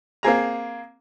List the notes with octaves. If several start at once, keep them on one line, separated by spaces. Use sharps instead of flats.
A#3 C4 G#4 A#5